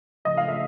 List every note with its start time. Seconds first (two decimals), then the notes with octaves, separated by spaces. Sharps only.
0.25 C#3 F3 A3 D#5
0.37 F5
0.48 E5